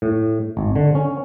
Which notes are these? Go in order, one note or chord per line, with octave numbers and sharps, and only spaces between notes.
A2
G#1
D3
C#4